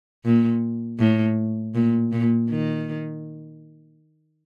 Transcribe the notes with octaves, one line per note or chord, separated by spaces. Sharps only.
A#2
A2
A#2
A#2
D#3